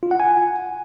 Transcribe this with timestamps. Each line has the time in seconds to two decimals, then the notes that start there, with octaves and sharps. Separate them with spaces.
0.03 F4
0.11 F#5
0.20 G#5